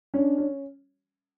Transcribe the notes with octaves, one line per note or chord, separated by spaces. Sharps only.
C#4 D4
C#4